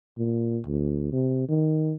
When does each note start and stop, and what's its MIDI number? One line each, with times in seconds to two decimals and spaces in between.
0.18 0.60 46
0.66 1.11 38
1.12 1.49 48
1.49 1.95 51